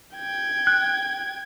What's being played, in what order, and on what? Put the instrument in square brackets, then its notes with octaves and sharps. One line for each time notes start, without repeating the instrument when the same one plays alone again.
[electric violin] G5 G#6
[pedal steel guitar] F#6